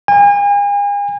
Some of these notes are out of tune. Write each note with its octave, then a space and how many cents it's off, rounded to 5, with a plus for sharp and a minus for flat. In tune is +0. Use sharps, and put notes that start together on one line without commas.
G#5 -40